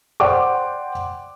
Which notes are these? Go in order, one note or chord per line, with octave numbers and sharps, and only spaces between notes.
C5 D5 F#5 G5 C6 D6